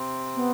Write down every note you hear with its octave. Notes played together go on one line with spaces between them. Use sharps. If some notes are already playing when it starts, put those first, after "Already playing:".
Already playing: C3 C4
B3